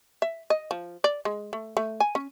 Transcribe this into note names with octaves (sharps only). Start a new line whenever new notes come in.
E5
D#5
F3
D5
G#3
A3
A3
G#5
C#4